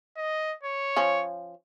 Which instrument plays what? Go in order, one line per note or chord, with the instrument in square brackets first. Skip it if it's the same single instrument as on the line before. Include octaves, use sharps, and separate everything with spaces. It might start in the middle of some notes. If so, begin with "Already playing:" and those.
[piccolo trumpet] D#5
C#5
[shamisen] F3 C#4